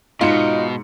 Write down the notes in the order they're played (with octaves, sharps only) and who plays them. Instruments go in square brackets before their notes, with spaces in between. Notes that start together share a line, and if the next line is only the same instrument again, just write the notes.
[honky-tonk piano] G#2 C#7 [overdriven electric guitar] B2 [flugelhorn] D#4 [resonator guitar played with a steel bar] F4